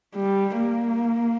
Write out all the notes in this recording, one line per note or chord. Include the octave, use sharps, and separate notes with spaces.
G3
A#3